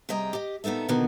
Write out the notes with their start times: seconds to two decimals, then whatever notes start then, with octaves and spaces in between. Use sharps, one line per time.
0.09 C3 G3 G#4 D#5 G5 A#5
0.33 G4 D#5
0.64 A#2 B3 D#4 A4 E5
0.88 B2 D3 D#3 A#3 B3 F#4